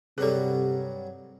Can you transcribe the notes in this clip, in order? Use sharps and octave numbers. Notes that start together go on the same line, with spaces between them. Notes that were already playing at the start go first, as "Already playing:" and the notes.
G2 C3 F#3 G3 G#4 A4